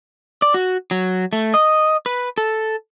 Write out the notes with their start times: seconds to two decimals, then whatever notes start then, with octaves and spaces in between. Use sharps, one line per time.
0.42 D5
0.54 F#4
0.91 F#3
1.33 A3
1.54 D#5
2.06 B4
2.38 A4